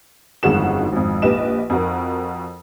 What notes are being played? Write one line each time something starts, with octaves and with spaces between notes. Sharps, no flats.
G1 F2 D#3 G#3 F#4 E7
G#1 F2
A#1 G4 B4 D#5 E7
F2 F#4 A#4